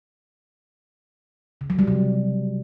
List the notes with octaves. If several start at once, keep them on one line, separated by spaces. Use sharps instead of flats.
C#3
F#3
G3
C3